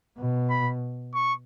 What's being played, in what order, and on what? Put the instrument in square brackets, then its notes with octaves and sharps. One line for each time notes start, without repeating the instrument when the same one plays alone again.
[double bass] B2
[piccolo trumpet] B5
C#6